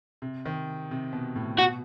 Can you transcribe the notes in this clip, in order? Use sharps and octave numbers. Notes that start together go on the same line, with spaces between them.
C3
D#3
C3
B2
A2
B2 F#4